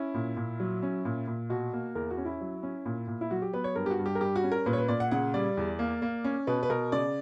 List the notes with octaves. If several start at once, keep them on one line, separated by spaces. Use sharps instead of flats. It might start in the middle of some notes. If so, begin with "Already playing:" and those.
Already playing: C#4 E4
A#2
A#2
F#3
C#4
A#2
A#2
B2 F#4
A#3
E2 A#4
F#4
C#4
E4
F#3
C#4
A#2
A#2
E4
F#3 F#4
G4
B3 B4
C#5
G2 A#4
G4
F#4
G2
G4
A#4
G3 G4
F#4
C#4
A#4
A#2 B4
C#5
B4
A#2 D5
F#5
C#3 F#5
G3 D5
E2
A#3
A#3
C#4
B2 B4
B4
B2 A#4
C#3 D5